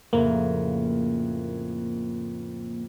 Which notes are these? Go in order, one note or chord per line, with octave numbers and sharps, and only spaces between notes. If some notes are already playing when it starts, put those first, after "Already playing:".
F2 A2 C#3 A#3